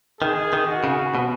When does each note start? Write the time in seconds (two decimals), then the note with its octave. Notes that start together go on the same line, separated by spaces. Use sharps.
0.21 D#3 G#4
0.53 D#3
0.67 F#4
0.84 C#3
1.15 B2